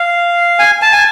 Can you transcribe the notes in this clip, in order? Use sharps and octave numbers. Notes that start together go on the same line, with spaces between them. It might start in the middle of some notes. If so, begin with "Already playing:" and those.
Already playing: F5
G#5
A5
G#5